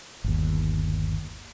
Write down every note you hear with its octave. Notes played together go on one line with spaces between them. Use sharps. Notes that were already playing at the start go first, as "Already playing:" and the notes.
G1 D#2